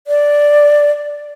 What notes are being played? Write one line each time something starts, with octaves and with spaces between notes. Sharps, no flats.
D5